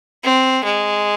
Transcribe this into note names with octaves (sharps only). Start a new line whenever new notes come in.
C4
G#3